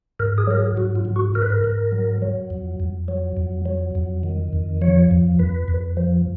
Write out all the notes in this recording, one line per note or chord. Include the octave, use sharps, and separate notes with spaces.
G#2 A#4
G#4
F#3 A#4
G#4
G#2 F#4
F4
G#2
F#4
G#2 A#4
B4
A#4
G#2
F#3
F#3
F2
F2
F#3
F2
F#3
F2
D#3
F2
F3 C#5
F2
F2 B4
F2
F3